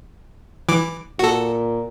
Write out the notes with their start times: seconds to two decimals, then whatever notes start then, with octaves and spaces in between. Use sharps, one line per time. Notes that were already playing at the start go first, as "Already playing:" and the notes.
0.69 E3 D6
1.19 A#2 F#4 A4